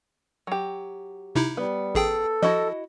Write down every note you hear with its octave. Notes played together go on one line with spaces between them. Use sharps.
F#3 G4
C3 D#4 E4
G3 B3
A1 G#4 A4 G5
F3 E4 F#4 D#5